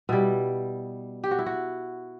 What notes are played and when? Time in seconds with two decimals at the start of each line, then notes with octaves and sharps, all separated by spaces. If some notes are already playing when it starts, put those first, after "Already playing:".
0.09 B2 G3 E4
1.24 G4
1.31 F#4
1.39 E4
1.46 F#4